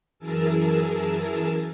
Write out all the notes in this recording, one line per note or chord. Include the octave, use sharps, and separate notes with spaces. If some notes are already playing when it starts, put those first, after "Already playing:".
F#2 E3 G#4 A#4 A5 E6